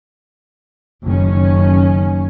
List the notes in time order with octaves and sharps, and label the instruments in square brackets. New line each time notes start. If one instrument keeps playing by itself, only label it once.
[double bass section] F#1 D#3 C#4